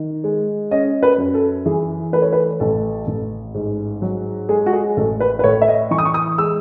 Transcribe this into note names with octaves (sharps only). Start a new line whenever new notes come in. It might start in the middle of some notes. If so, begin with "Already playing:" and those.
Already playing: D#3
G#3
C#4 D#5
B4
F#2
A4
E3 G#4
A3 B4
C#5
B4
A1 A4
A1
G#2
F#3
G#3 G#4
F#4
G#4
A1 A4
B4
B4
A2 C#5
E5
D#5
E3 C#6
D#6
C#6
D#6
G#3 E6